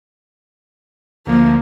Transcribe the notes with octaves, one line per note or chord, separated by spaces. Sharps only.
D2 F3 A#3